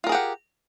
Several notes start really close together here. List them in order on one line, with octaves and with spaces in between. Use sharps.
F4 A#4 G#4 G4 F#5